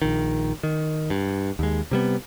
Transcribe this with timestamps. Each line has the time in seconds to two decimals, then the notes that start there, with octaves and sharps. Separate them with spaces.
0.02 A#1 D#3
0.63 D#3
1.10 G2
1.59 D#2 G#3
1.91 C3 G3 B3